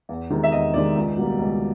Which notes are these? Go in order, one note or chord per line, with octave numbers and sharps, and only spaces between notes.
E2
C3 D#3 G#3
E5
E2 D#5
C3 D#3 G#3 D5
C#2
B2 G3 A#3
C#2